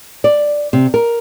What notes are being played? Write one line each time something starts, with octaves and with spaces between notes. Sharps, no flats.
D5
C3
A#4